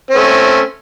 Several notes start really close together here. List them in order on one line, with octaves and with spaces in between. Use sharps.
C#4 C4 A3